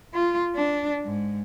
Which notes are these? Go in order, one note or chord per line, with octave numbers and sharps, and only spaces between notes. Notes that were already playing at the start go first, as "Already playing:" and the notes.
F4
D4
G#2